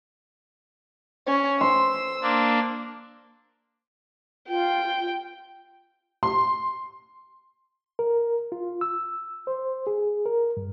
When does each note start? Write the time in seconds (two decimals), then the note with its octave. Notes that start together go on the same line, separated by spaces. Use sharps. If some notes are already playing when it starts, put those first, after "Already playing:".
1.27 C#4
1.61 C5 C6 E6
2.22 A#3 D4
4.49 F4 G5
6.23 C6
7.99 A#4
8.52 F4
8.81 E6
9.47 C5
9.87 G#4
10.26 A#4
10.57 G2